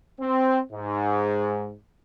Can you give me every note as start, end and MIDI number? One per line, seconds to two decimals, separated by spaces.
0.20 0.60 60
0.73 1.73 44